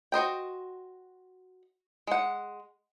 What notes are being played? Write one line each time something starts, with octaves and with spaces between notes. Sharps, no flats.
F#4 C5 D#5 G5
G#3 F#5